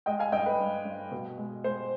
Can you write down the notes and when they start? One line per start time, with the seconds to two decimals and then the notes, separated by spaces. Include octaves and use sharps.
0.06 G#3 D#5 G5
0.19 F5 G#5
0.32 G2 D#5 G5
0.46 B4
0.60 G2
0.85 G2
1.11 B2
1.38 G#3
1.64 G#3 C5